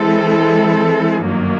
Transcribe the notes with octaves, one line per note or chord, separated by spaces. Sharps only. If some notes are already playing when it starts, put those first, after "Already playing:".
Already playing: E3 G#3 C4 E4 A4
G1 F#2 D#3 F#3 A#3